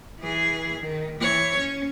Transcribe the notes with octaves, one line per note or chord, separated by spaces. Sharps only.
E3 G#4
D#3
E3 C#5
C#4